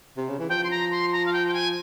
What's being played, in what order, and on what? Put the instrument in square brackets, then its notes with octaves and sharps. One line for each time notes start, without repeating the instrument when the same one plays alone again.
[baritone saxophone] C3
C#3
E3
[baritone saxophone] F3 [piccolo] G5
[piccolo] C6
A#5
C6
A#5
F5
G5
G5
G#5